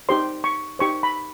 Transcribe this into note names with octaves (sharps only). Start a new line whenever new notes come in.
D#4 G4 C5 C6
C#6
D#4 G4 C5 C#6
B5